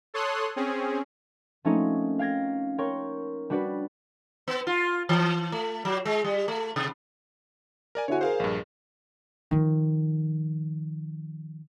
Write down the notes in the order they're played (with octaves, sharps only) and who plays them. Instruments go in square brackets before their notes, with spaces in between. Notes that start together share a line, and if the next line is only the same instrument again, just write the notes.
[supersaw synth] A4 C#5 C6 D#6 F#6
C4 C#4 G#4
[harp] F3 A3 A#3 C4 C#4 D#4
F5 G5 G#6 A#6
A#4 C#5 G5 C6 C#6
G3 D4 F#4 B4 D5
[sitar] B3
F4
E3
A3
F#3
G#3
G3
A3
C3
[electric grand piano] A#4 D5 G#5
[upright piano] D3 E4 F#4 [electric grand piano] C#5 G#5
[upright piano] G#4 A#4 [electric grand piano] C5 F5
[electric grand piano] A#1 G2
[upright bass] D#3 F3